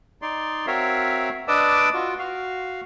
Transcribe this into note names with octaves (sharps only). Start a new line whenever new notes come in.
D#4 D5 C6
C4 F#4 A#4 C#5 E5 F5
D4 B4 D5 D#5 D6 E6
F4 F#4
F#4 F5